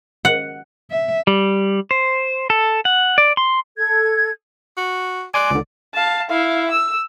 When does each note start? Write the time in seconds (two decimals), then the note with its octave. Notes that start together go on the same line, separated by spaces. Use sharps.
0.25 F#5
0.90 E5
1.27 G3
1.91 C5
2.50 A4
2.85 F#5
3.18 D5
3.37 C6
3.77 A4 G#6
4.77 F#4
5.34 D5 G#5 C6 F#6
5.51 C#2 D3
5.94 F5 A5
6.29 E4 F5
6.71 E6